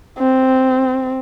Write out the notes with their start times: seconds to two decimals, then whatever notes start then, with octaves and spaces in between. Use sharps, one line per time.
0.19 C4